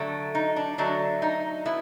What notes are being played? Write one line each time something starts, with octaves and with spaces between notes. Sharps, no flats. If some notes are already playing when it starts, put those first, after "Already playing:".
Already playing: D3 F#3 A3
D#4
D4
D3 F#3 A3 D4
D#4
B3 E4